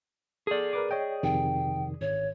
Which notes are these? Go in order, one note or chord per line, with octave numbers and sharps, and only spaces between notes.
G#4 A4 D5
A#4 B4 D6
C#5 D#5 G5
F2 C3 D#3 G5
G#1 C#5